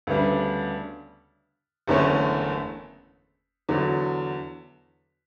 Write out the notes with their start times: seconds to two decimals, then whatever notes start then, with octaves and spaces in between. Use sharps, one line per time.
0.07 D2 C#3 G3 B3 D4
1.88 F#1 E2 D3 A3 C#4
3.69 E2 D3 F#3